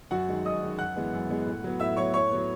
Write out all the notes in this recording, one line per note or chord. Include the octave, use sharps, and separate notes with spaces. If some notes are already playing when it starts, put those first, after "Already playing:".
F#2 F#4 F#5
D#3 G#3
F#2 D#5 D#6
D#3 G#3
F#2 F#5 F#6
E3 G#3 B3
F#2
E3 G#3 B3
A2
F#3 B3
A2 E5 E6
F#3 B3 C#5 C#6
A2 C#5 C#6
F#3 B3